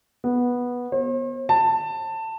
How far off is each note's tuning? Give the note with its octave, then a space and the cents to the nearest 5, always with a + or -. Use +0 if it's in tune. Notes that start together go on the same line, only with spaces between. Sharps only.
B3 -10
C5 +45
A5 +15